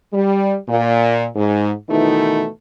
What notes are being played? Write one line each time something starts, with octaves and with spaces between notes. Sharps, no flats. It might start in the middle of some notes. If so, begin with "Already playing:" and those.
G3
A#2
G#2
B2 D#3 E3 A3 D#4 E4